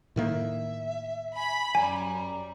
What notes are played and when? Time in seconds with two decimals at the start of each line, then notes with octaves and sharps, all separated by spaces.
0.16 A2 D#3 A#3 E5
1.36 G#5 B5
1.75 F#2 G3 G#5 A#5